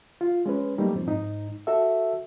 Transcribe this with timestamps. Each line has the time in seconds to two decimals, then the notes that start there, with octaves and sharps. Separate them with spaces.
0.21 F4
0.46 G#3 C#4 B4
0.78 F#3 G3 A3 A#3 D#4
0.95 G2 F3 C4
1.07 G#2 D#4
1.67 F#4 A4 E5